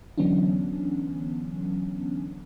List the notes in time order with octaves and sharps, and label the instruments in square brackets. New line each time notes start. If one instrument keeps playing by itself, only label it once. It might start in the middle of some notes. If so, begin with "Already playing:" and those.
[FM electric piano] D3 E3 F#3 B3 C#4 D4